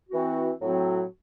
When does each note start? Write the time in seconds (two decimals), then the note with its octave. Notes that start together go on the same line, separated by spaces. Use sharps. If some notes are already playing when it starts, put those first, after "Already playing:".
0.09 E3 C4 F#4
0.60 A2 F#3 C4 F#4